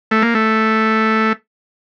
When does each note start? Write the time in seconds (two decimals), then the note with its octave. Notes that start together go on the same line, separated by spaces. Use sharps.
0.11 A3
0.22 A#3
0.35 A3